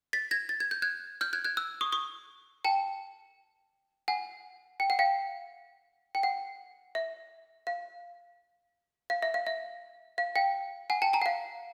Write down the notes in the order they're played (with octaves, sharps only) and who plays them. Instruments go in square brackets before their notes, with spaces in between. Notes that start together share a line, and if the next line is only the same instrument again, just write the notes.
[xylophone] A6 B6
G#6 A#6
A6
G#6
G6
F#6 G#6
F6 G6
F#6 G#6
F#6 G#6
E6 F#6
C#6 D#6
C#6 D#6
G5 A5
F#5 G#5
G5
F#5
F5 G5
G5
F#5
E5
F5
F5
E5
F5
E5
F5
F5 G5
F#5 G#5
G5 A5
G#5 A#5
F#5
F5